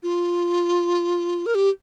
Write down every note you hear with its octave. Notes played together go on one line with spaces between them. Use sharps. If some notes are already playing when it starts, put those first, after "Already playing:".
F4
A#4
G4